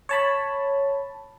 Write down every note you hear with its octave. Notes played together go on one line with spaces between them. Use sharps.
C#5 A5 B5